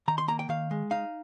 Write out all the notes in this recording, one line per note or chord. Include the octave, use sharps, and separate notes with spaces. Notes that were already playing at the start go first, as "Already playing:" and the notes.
D#3 A#5
C6
A#3 A#5
G5
D#3 F5
G#3
D#4 F5